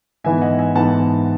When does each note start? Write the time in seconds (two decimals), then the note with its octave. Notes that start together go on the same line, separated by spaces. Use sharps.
0.24 G#2 E3 B3 E5 G#5
0.41 D#5 F#5
0.58 E5 G#5
0.75 G#2 E3 B3 F#5 A5